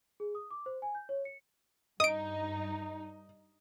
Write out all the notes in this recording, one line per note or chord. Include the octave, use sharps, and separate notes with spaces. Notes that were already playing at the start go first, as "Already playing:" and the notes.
G#4
D#6
D6
C5
G#5
G6
C#5
C#7
G2 D#4 D#5 D#6 D7